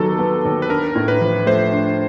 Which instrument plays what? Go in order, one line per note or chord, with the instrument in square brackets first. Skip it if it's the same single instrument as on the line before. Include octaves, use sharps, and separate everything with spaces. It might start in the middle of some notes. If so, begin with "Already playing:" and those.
Already playing: [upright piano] D#2 D#3 F#3 B3 [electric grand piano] A4
[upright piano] B3
D#2
[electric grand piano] B4
[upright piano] D4 [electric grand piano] A#4
[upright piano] A2
[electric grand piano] B4
[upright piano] F3
[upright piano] A3 [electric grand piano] C5
[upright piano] D4